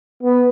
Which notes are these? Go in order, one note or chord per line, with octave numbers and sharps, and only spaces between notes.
B3